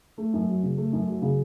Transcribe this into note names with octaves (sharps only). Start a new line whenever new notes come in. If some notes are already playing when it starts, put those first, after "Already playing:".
A3
F#2
F#3
C#3
A3
F#2
F#3
C#3